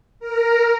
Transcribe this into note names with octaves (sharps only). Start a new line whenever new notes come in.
A#4